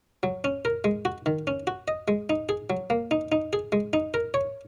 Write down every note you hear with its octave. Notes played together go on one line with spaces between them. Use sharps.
F#3
C#4
A#4
G#3
F#4
D#3
C#4
F#4
D#5
G#3
D#4
G#4
F#3
A#3
D#4
D#4
G#4
G#3
D#4
A#4
C#5